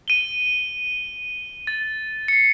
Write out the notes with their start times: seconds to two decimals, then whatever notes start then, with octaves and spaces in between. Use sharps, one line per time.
0.08 D#7 G7
1.67 A6
2.28 C7 C#7